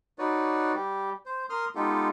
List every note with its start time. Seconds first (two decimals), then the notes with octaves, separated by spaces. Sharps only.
0.19 D#4 F#4 B4 C#5 D5
0.75 G3 G4
1.26 C5
1.50 A#4 C6 D#6 F6
1.75 G#3 B3 D#4 F4 G4 A4